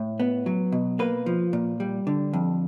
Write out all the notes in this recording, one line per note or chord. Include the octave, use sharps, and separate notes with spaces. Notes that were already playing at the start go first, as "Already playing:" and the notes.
Already playing: A2
B3
F#3
B2
A#3 B4
F3
A#2
G3
D3
F2